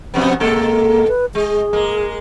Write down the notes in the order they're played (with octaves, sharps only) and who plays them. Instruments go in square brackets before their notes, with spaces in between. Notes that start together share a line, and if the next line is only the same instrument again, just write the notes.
[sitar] F2 C3 B3 [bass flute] C4
[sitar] B2 G#3 A4 [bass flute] A#3
[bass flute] B4
[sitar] G#3 [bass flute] G#4
[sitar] G#3 A#3